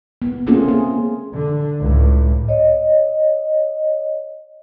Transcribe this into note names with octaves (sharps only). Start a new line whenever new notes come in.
B3
A3 A#3 C4 C#4 F4 G#4
G#4
D3
C#2 A2
C#5 D#5